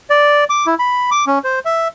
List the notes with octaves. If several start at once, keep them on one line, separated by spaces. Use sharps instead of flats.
D5
D6
E4
B5
D6
C#4
C5
E5